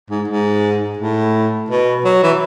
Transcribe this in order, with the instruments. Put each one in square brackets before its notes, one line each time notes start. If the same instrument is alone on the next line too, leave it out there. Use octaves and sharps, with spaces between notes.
[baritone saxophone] G#2
G#2
A2
B2
F#3
E3